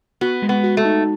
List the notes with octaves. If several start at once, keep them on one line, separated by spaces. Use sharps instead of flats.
B3 F#4
G#3
B3
F#4
A3
D#4